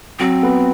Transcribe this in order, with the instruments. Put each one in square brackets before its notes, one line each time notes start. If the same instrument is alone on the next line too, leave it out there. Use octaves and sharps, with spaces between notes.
[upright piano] F#3 [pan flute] C4
[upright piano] B3